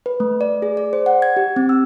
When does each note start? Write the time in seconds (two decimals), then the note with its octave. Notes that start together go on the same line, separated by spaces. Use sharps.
0.06 B4
0.20 A3
0.41 D5
0.62 G#4
0.77 D5
0.93 C5
1.06 F#5
1.22 G#6
1.37 G4
1.56 C4
1.69 E6